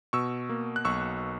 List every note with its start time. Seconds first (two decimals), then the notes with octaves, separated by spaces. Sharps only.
0.13 B2 C#6 E6
0.50 A#3
0.76 F#6
0.85 B1 C#6 E6